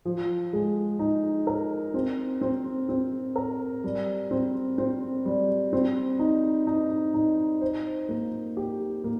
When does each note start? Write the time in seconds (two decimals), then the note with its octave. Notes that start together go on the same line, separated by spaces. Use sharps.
0.05 F3
0.53 G#3
0.99 D#4
1.47 A#4
1.94 C4
2.41 C4
2.89 C4
3.36 A#4
3.84 G3
4.31 C4
4.78 C4
5.26 G3
5.73 C4
6.19 D#4
6.67 D#4
7.14 D#4
7.61 C5
8.09 A#3
8.57 G4
9.04 A#3